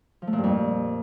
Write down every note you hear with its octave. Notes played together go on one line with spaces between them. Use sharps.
F3
A3
A#2
G2
F2